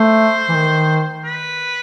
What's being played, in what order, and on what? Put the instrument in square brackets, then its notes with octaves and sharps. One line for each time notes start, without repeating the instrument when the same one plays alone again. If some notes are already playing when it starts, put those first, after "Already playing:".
Already playing: [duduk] A3 [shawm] C5
[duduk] E3
D#3
[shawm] B4